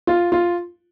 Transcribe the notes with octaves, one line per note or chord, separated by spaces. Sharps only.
F4
F4